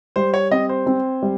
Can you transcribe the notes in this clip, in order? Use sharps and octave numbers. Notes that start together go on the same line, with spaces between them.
G3 C5
C#5
C4 D#5
C5
C4
G3